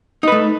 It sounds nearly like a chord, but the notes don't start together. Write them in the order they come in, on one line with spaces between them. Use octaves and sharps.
D#4 B4 A3